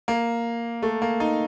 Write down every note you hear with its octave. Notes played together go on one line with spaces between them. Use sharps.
A#3
A3
A#3
D#4